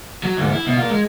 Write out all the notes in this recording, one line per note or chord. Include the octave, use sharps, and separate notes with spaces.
F#3
D2 G#2
E4
B2
F4 A#4
G#3